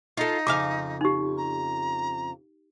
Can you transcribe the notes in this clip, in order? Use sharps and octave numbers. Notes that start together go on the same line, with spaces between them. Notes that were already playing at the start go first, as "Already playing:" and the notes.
D#4 F4 A4
F2 C#3 F5 D6
D#4 G4
A#5